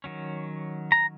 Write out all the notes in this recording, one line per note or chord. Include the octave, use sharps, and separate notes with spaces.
D#3 F#3 C#4
A#5